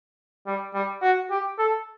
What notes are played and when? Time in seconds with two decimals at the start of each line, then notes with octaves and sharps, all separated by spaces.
0.47 G3
0.74 G3
1.03 F#4
1.31 G4
1.59 A4